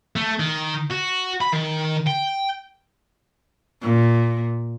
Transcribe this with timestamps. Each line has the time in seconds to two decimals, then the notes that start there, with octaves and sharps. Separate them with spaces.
0.16 A3
0.40 D#3
0.90 F#4
1.41 B5
1.52 D#3
2.07 G5
3.82 A#2